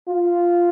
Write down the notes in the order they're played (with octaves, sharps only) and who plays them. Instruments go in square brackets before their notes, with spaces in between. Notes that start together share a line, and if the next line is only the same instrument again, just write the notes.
[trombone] F4